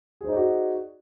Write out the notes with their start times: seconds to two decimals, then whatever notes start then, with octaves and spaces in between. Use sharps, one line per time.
0.21 G#4
0.24 C5
0.28 D#4
0.32 D5
0.36 F#4